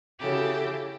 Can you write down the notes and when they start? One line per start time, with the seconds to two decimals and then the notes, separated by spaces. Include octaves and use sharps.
0.18 C#3 E4 F#4 G4 A4